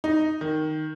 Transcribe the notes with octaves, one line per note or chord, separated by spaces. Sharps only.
D#4
D#3